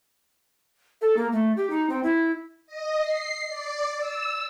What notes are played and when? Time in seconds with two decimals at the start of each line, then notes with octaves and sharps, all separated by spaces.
1.02 A4
1.17 A#3
1.32 A3
1.57 G4
1.70 D#4
1.90 C4
2.03 E4
2.67 D#5
3.03 C7
3.48 D5
3.97 E6